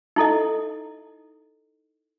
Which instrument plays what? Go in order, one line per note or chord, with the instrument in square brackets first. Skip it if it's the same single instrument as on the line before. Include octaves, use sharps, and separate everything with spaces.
[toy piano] D#4 E4 A4 D#5